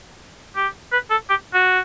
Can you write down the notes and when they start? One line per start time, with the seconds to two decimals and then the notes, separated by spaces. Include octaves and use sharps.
0.56 G4
0.92 B4
1.11 A4
1.29 G4
1.54 F#4